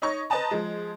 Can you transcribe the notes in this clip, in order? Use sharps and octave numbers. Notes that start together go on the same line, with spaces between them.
D#4 C#5 D#5 C#6
B4 C5 D#5 A5 A#5
F3 G#3